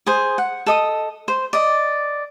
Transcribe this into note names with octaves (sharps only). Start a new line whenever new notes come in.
G#4 C5
F#5
A4 D#5 D#6
C5
D5 D#5